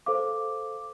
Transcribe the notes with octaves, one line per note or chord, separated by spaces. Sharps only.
A4 C5 F5 D6